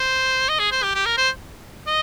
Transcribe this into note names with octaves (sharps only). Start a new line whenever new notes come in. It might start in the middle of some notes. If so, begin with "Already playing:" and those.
Already playing: C5
D#5
G#4
C5
G4
G4
A#4
C5
D#5